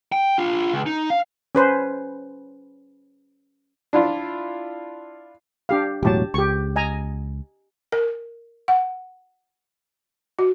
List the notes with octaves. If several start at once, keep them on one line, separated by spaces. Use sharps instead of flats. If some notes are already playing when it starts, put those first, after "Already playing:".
G5
D4 F4
C#2
D#4
F5
C#4 B4 C5
D4 E4 F4
D4 G4 F5
E1 A2 F#3 G4 A5
C#2 G4 C#6
D#5 G#5 A#5
A#4
F#5
F#4